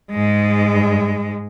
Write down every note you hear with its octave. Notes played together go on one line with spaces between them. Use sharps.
G#2 G#3